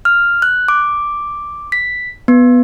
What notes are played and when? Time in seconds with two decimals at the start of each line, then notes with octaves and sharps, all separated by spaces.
0.05 F6
0.42 F#6
0.68 D6
1.72 B6
2.28 B3